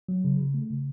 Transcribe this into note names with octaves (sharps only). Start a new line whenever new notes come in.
F#3
C#3
C#3
A3
C#3